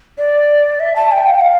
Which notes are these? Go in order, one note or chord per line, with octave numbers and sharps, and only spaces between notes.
D5
E5
A5
G5
F5
G5
F5